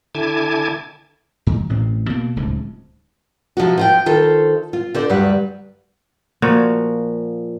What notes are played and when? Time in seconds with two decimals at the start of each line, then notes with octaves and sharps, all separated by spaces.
0.15 D3 E4 G#5 A5 D6 G#6
1.47 G2 E3
1.69 A1 A2 E3 C4
2.09 B2 A#3
2.36 D1 C#2 G#2 C3
3.57 C3 F3 G#3 F#4
3.78 F3 F4 G5
4.06 D#3 F4 A4 C5
4.73 F4
4.95 D3 C5 D5
5.09 D2 G2 F#3 G3 B4 F#5
6.42 A#2 F3 F#4